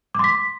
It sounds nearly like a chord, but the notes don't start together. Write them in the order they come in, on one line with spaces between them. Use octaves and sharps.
D6 C6 B6